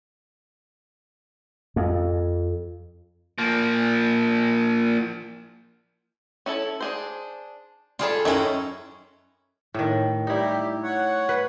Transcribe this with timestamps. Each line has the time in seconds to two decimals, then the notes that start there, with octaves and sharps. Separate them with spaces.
1.76 F2
3.38 F3 A#3
6.46 C#4 E4 A4
6.80 D4 G#4 C5
7.99 G3 D4 F4 G#4 A4 B5
8.25 F#2 D#3 C#4 E4
9.74 A2 D#3
10.27 G3 D#4 E4 G4
10.83 C#5 F#5
11.29 B4